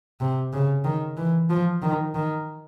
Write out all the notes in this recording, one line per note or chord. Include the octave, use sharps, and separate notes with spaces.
C3
C#3
D#3
E3
F3
D#3
D#3